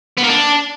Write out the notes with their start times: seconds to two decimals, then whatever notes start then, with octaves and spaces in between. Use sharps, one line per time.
0.18 B3
0.23 A#3
0.29 D4